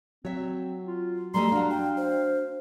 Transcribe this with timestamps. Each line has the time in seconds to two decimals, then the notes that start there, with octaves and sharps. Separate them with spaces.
0.25 F#3 C4 C#5 E5
0.87 F4
1.34 G3 A3 D#5 A#5 C6
1.52 D4 F#4 F5
1.70 G5
1.97 C5